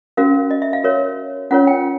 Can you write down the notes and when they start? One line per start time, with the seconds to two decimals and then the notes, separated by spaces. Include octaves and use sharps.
0.17 C#4 F#4 A#4 F5
0.51 D#5
0.62 E5
0.73 F5
0.84 F#4 A#4 C#5
1.51 C#4 F4 A#4 C#5 F#5
1.67 G5